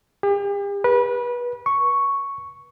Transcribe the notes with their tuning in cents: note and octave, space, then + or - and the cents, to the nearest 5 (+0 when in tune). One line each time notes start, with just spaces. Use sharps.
G4 +40
B4 -25
C#6 +0